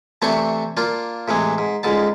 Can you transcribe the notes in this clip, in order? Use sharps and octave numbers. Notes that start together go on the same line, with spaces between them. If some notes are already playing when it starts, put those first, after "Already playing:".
C3 E3 A3 C4 D4 C#6
A#3 D4 F4
A2 C3 E3 G#3
G#2
C#2 G#2 D3 A5